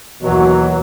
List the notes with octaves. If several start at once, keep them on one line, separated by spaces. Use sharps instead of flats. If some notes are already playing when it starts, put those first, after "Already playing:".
D#2 B2 E3 F#3